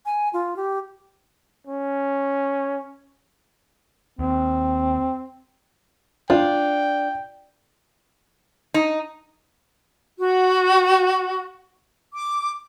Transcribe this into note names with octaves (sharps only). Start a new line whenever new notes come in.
G#5
F4
G4
C#4
D#2 C4
D4 F4 G5
D#4
F#4
D6